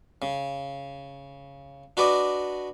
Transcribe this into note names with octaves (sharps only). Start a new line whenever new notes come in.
C#3
D4 F#4 B4 D5 D#5